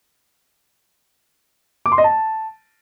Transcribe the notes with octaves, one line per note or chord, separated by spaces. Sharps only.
D6
C6
D#5
A5